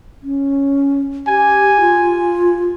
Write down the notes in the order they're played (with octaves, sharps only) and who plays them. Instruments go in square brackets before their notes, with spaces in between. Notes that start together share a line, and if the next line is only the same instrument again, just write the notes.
[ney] C#4
[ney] G4 [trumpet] G#5
[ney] F4